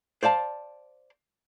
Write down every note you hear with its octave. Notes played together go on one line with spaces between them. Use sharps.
C5 D5 F5 A5